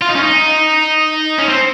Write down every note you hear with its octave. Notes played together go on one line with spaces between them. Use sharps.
F4
D#4
C#4
D#4
C#4
C4